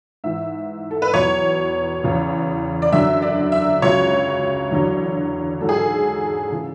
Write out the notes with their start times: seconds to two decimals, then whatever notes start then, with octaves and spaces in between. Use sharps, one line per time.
0.24 G#2 E3 E5
0.91 A4
1.02 B4
1.13 E2 B2 F#3 C#5
2.03 E2 C#3 E3
2.82 D5
2.92 F#2 D3 F#3 E5
3.22 D5
3.52 E5
3.82 C#2 C#3 F#3 C#5
4.71 E2 D3 F#3
5.61 G#2 F#3 A4
5.69 G#4
5.77 A4
6.52 C#3 E3